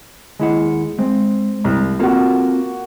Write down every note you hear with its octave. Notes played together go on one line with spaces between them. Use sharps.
D#2 G#3 E4 F#5
G#3 C4
C2
A#3 C4 F4 F#4 A4